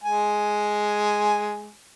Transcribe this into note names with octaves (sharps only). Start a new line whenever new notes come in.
G#3 G#5